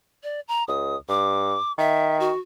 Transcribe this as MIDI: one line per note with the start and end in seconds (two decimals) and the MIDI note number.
0.24 0.40 74
0.48 0.64 82
0.68 0.96 37
0.68 0.96 87
1.09 1.56 43
1.09 1.72 86
1.79 2.30 51
1.79 2.19 76
2.20 2.39 66